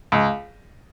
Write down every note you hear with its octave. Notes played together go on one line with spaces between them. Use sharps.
C#2